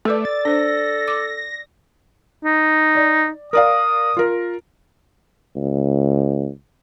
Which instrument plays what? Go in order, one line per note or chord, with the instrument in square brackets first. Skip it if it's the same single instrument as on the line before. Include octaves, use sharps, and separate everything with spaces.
[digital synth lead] A3 [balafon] A4 B4 [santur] D5 E6
[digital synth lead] A6
[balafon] D4 C5 [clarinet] A4 [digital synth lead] A#6
[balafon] D6
[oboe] D#4
[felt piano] D5
[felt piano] A#4 D5 F5 [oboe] D#6
[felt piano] F4 A#4
[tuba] C#2